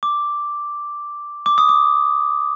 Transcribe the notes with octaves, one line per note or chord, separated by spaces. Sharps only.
D6
D6
D#6
D6